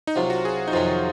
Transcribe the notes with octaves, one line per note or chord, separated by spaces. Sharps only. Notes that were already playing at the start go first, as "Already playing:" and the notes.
D#4
C2 C3 F#3 F4
F#4
G#4
D#4
F2 C3 D#3 F#3 F4